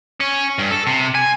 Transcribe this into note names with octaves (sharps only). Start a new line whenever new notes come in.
C#4
G2
A4
C3
G#5